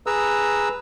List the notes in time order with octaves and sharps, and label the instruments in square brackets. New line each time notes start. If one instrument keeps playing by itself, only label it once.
[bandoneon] G#4 B4 A#5 E6